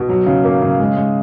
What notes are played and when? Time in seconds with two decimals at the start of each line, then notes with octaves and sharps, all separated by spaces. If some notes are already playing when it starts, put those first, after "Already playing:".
Already playing: B2
0.09 F#3
0.26 C#3
0.44 A#3
0.62 C#3
0.79 G#3
0.97 G#3